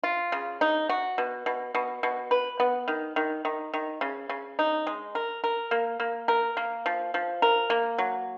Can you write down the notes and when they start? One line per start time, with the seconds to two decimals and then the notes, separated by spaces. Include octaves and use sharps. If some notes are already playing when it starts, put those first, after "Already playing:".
0.04 F4
0.32 C#3
0.61 D#4
0.89 F#4
1.18 B2
1.46 B2
1.75 B2
2.03 B2
2.31 B4
2.60 B3
2.88 D#3
3.16 D#3
3.45 D#3
3.74 D#3
4.01 C#3
4.29 C#3
4.59 D#4
4.87 G#3
5.15 A#4
5.44 A#4
5.71 A#3
6.00 A#3
6.28 A#4
6.57 A#3
6.86 F3
7.14 F3
7.42 A#4
7.70 A#3
7.98 F#3